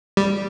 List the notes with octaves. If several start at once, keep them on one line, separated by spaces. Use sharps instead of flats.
G3